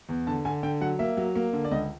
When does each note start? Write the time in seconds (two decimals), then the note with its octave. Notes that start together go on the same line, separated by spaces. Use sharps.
0.09 E2
0.27 D3 A5
0.45 D3 G#5
0.63 D3 G5
0.81 F#3 F#5
0.99 A#3 E5
1.17 F#3
1.35 A#3
1.53 D3
1.65 D5
1.71 C#2 D#5